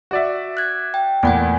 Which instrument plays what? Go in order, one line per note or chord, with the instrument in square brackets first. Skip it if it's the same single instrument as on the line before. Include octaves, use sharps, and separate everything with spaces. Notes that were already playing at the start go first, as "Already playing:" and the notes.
[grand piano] F#4 D5 E5
[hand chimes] F#6 G#6
G5
[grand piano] E2 A#2 [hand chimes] A3 F#5 G#5